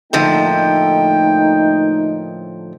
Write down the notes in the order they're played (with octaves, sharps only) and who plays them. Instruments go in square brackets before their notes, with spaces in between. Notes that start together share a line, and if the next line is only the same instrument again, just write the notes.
[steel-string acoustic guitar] A2 D3 F3 [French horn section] A3 A#3 D#4 [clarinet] G5